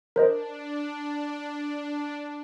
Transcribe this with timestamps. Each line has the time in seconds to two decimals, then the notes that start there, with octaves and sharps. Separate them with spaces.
0.16 D4 A#4 C5 D#5